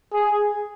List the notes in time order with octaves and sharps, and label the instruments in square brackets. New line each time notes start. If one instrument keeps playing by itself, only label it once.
[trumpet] G#4